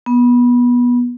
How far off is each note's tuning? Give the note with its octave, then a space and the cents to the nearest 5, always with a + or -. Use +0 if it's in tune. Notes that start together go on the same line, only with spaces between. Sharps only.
B3 -20